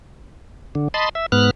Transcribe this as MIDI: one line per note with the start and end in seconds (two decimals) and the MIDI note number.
0.75 0.88 50
0.94 1.09 75
0.94 1.09 81
0.94 1.09 83
0.94 1.09 84
1.15 1.26 76
1.32 1.51 44
1.32 1.51 59
1.32 1.51 89
1.32 1.51 90